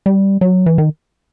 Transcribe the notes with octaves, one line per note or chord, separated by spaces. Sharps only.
G3
F#3
E3
D#3